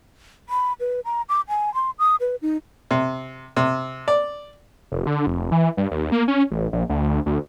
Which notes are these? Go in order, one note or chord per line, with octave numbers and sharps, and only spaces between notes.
B5
B4
A#5
D6
G#5
C6
D#6
B4
D#4
C3
C3
D5
F1
D3
F1
E3
G2
D#2
A#3
C#4
A1
A#1
D2
D2